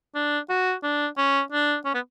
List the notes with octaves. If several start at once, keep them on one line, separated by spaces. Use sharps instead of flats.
D4
F#4
D4
C#4
D4
C#4
B3